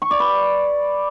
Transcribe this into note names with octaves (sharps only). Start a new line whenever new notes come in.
C#6
D5
B4